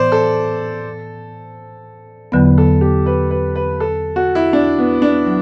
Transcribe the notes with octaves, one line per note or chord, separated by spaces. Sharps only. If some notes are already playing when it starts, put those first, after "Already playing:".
Already playing: A2 E3 B3 C5 D5
A4
E2 D3 F#3 B3 B4
A4
G4
B4
B4
B4
A4
F#4
E4
D4
B3
D4
F#3